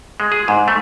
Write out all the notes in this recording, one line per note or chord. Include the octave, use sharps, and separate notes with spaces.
G#3
G#4
G#2
A3